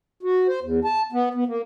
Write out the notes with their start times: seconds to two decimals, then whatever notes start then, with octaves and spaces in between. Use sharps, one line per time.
0.23 F#4
0.48 C5
0.62 E2
0.84 A5
1.12 B3
1.34 B3
1.47 A#3